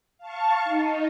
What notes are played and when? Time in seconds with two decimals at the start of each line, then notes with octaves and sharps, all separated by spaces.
0.18 F5 A5 C#6
0.64 D#4